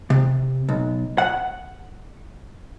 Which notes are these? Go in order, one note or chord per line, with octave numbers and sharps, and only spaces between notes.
C3
B1
F#5